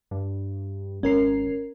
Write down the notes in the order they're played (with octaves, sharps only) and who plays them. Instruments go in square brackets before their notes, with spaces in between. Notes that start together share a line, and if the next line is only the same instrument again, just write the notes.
[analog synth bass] G2
[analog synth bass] G#1 [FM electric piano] C#4 A#4 C7